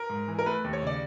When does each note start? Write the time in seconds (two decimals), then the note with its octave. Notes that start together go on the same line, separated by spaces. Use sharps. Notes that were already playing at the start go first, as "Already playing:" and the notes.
Already playing: A#4
0.10 G#2
0.28 E3
0.39 A#4
0.46 A3 B4
0.64 D#2
0.73 C#5
0.83 C#3 D5